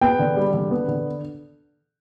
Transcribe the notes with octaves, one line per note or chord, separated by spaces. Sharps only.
B3 G5
D3
G3
D3
B3
D3